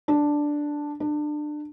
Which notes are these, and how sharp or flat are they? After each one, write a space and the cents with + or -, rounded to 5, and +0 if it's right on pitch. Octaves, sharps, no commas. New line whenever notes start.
D4 +0
D4 +25